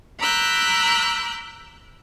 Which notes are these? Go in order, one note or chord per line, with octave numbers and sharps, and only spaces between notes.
A#5 B5 D6 E6 F#6 G6